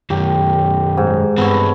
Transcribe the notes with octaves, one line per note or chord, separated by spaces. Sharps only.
F#2 D#3 G4
G#2
G2 B3 C4 A4 C#5